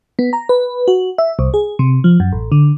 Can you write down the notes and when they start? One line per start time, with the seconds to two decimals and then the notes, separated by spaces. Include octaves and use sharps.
0.19 B3
0.33 A#5
0.49 B4
0.88 F#4
1.18 E5
1.39 C2
1.54 G#4
1.79 C3
2.04 F3
2.20 F#2
2.32 A1
2.52 D3